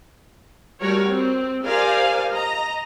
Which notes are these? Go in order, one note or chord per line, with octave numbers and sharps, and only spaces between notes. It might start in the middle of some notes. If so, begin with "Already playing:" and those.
G3 A3 F#4 G4 A#4 C#5
C4
G4 A#4 C5 D5 F5 G#5
D#5 A#5